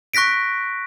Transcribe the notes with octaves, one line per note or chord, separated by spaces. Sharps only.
C#6 F#6 A#6 B6 D7